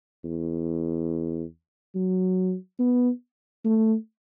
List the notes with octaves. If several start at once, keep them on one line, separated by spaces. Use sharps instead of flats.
E2
F#3
B3
A3